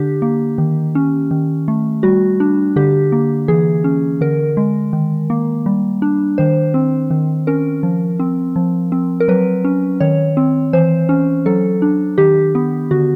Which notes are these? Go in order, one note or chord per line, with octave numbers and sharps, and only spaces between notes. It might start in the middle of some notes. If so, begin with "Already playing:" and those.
Already playing: D3 D4 G4
A#3
D#3
C#4
D#3
A3
G3 F#4
D4
D3 G4
A#3
E3 G#4
C#4
D3 A#4
G#3
D#3
A#3
G3
D4
D#3 C5
C4
D#3
C#4 A#4
F3
C4
F3
C4
A#4
F#3 B4
C#4
D#3 C#5
C4
E3 C5
C#4
F#3 A4
D4
D#3 G4
B3
D3 F#4